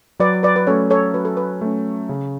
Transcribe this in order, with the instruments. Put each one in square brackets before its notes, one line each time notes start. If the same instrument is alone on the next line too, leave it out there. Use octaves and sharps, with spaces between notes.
[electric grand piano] F#3 [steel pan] B4 D5
[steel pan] B4 D5
B4
[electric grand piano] A3 C#4 [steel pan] A4 C#5
[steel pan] A4 C#5
[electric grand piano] F#3 [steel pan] B4
[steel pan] A4
B4
[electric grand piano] A3 C#4
C#3